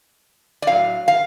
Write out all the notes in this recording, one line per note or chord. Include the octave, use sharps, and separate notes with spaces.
D5
A2 F#3 C#4 F5
F5